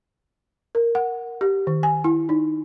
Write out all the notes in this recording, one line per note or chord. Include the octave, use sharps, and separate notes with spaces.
A#4
F#5
G4
D#3
G#5
E4
D#4